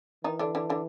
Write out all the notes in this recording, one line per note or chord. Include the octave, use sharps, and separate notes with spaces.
D#3 E3 D#4
D3 D4
D3 D4
D3 D4